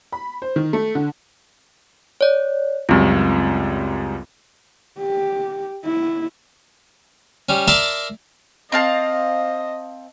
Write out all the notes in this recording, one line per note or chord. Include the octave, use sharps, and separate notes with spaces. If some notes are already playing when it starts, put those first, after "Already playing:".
B5
C5
D#3
A3
D3
C#5 D5
C#2 F#2 G3 C4 F4
G4
E4
G3 C#4
A#4 D5 E5 A5 A#5 C6
C4 D#5 F5 A5